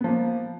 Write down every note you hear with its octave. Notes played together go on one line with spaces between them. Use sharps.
F3 A#3 B3